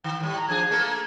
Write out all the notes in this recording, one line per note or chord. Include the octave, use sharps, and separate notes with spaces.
D#3 G5
A2 G3
A#5
F3 D4 G#4 G#6
A3 A#3 A4